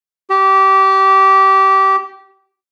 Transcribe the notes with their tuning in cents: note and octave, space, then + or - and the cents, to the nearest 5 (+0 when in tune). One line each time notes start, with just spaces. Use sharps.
G4 -20